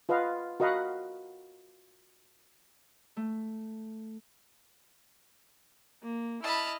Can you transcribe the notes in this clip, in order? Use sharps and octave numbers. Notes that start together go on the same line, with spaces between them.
F4 B4 D#5 F5 F#5
F#4 A#4 D#5 F5 F#5 B5
A3
A#3
E4 D#5 A5 B5 F6